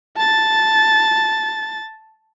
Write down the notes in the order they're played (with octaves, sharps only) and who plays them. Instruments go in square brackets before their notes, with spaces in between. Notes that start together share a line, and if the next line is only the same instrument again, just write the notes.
[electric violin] A5 A6